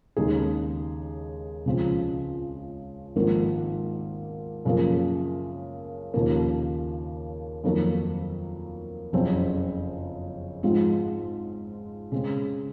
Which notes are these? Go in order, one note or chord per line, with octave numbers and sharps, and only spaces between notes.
D#2 C#3 G#3 D#4 G#4
C#2 C#3 F3 C4
G#1 G#2 F3 A#3
F#2 C#3 F3 A#3
D#2 C#3 F3 A#3
F2 D#3 F#3 A#3
F#1 F2 C#3 F#3 C4
G#2 F3 G#3 C4 F4
C#3 G#3 C4